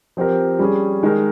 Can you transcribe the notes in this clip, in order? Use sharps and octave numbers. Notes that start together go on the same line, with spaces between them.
F3 C4 G4 A#4
G3 C#4 G#4
D#3 G#3 D#4 A#4